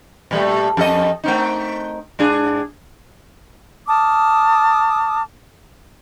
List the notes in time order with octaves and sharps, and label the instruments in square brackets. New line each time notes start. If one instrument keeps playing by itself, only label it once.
[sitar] A#2 G3 A3
F2 A4 D#5
A3 C4 D#4
G#2 D4 G#4
[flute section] A5 D6 D#6 F6